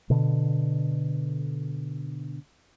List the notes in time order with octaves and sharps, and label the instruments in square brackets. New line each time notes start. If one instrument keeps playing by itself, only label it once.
[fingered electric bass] B2 D3